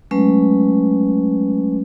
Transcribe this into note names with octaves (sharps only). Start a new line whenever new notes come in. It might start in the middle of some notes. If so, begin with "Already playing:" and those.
F#3 G#3 A3 C#4 B4